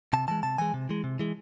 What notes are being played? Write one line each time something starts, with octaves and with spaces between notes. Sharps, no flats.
C3 A5
E3 G#3 A5
C3 A5
E3 G#3 G#5
C3
E3 G#3
C3
E3 G#3